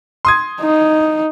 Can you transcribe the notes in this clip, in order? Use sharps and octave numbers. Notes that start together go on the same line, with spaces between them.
C6 D#6 G#6
D#4